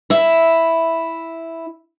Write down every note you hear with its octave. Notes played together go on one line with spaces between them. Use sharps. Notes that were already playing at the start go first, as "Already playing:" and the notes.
E4 E5